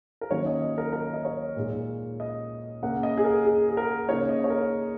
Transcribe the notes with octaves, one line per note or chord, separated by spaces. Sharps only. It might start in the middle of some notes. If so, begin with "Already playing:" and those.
A#4
D#3 F#3 A#3 C#4 C#5
D#5
D#5
A#4
A#4
D#5
C#5
A#2 G#3 D#4
D#5
C#3 A#3 C#4 F#5
D#5
G#4
A#4
G#4
G#4
A#4
C#3 A#3 D#4 C#5
D#5
C#5
A#4